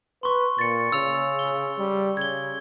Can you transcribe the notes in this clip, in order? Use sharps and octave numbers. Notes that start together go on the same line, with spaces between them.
B4 C6 C#6
A#2 A6 C#7
C#3 E6 F7
G7
G3
C#3 G#6 G7